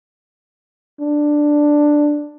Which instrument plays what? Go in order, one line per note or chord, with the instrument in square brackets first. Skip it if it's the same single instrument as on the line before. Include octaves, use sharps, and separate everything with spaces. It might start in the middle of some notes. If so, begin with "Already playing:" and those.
[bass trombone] D4